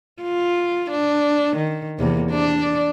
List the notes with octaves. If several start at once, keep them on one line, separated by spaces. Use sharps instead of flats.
F4
D4
D#3
E2 C3 A#3
D4 D5